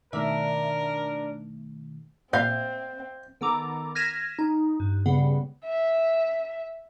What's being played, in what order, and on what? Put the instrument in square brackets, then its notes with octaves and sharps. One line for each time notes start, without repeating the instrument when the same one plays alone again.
[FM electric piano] B2 D#3 A3 [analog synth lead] D4 [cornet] A#4 [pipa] E5
[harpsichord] A#2 [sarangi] C4 [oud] F5 [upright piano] G6
[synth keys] D#3 B3 A4 A#5 D6
F6 G#6 A#6 B6 D#7 E7
D#4
G2
C#3 G3 B3
[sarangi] E5